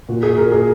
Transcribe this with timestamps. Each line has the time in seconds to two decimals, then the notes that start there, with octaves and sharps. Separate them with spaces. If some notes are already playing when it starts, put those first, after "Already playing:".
0.09 A#2 F#4
0.23 G#4
0.37 A#2 A#4
0.52 G#4